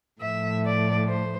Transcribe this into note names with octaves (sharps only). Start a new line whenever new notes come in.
A2 F3 A3 E5
D5
C5